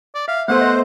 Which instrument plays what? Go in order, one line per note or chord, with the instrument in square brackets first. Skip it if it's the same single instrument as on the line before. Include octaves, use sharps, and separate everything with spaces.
[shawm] D5
[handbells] E5 [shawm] F5
[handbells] A3 B3 A4 [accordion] C5 [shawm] F#5
[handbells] D#5